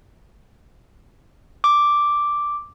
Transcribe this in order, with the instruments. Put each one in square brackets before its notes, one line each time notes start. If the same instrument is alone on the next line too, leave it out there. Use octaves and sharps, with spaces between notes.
[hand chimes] D6